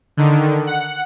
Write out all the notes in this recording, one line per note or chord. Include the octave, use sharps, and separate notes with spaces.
D3 D#3
F#5